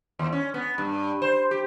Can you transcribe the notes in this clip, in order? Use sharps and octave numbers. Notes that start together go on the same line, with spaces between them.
D#2
C#4
B3
G2
C5
G4